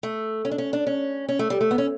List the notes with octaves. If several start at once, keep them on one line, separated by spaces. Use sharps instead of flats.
A3
C#4
D4
C#4
D4
C#4
C#4
A3
G3
A3
B3
C#4